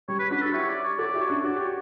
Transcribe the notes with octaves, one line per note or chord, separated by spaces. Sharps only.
G3 C#5
B4
D4 F#4 B4
A4
E4 G4 C#5
D5
C#5
F#4 A4 D5
E4 G4
C#5
D4 F#4
F#4 D5
G4 C#5